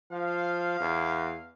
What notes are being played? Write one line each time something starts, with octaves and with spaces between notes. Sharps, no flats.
F3 F5
E2